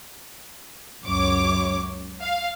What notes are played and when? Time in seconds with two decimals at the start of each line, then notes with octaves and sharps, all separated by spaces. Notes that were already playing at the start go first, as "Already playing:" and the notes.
1.03 C#2 F#2 C#5 D6
2.20 F5